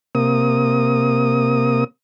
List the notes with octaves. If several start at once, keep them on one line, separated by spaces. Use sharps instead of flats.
C3 A#3 D#6